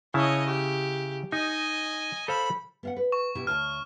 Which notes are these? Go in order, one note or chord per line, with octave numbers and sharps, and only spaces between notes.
C#3 E4 C#5 D#5 A5
G4
D#4 D#5 G#5
A4 C5 F5 B5
B3 F5 F#5
B4
C#6
B2 E4 G4
D2 C#5 A5 F6